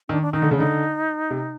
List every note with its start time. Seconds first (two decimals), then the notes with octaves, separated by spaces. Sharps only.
0.09 D#3 D4
0.22 D4
0.33 D#3 D#4
0.42 D3
0.51 C#3
0.57 D3 D#4
1.30 C3